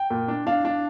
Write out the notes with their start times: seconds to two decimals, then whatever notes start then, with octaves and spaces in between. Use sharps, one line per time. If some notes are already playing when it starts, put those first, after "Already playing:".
Already playing: G5
0.10 A#2
0.28 D4
0.47 D4 F5
0.65 D4